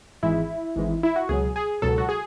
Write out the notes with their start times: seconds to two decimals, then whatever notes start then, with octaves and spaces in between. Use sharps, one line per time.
0.22 G#1 G#2 E3 G#3 E4
0.76 G#1 G#2 E3 G#3
1.03 E4
1.16 F#4
1.29 C#2 B2 F#3 G#4
1.56 G#4
1.82 C#2 B2 F#3 A4
1.98 F#4
2.09 G#4